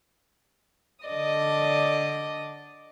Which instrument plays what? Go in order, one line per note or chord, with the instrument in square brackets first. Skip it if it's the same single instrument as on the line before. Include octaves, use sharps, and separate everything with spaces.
[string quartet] D3 D5 D#5 D#6